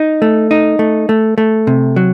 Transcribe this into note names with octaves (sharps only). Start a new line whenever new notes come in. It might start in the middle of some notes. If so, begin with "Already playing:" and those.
Already playing: D#4
A3
D#4
A3
A3
A3
C3
F#3